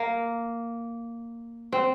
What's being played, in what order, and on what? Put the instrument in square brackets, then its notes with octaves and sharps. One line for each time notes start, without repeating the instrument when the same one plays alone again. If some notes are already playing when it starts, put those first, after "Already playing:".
Already playing: [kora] A#3
C4